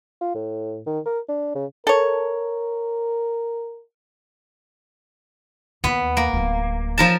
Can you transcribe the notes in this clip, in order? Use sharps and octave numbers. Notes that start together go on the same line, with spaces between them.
F4
A2
D#3
A#4
D4
C#3
A4 A#4 C#5
D#2 B3
A#3
D1 B3
F3 A#4 A5